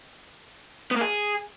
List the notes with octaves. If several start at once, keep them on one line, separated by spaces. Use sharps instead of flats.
B3
A#3
G#4